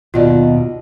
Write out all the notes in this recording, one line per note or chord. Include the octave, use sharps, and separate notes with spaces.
D#2 B2 F4 D5